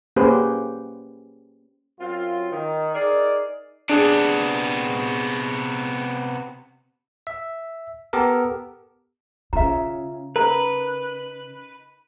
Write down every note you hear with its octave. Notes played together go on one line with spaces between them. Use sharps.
A#3 C#4 G4 G#4 B4 C5
F#2 C4 F4
D#3
D#4 G#4 A#4 D5
C3 B3 D4 G#4
E5
B3 G4 A4 A#4
C#3 F4 E5 A#5
D#4 A#4 B4 A#5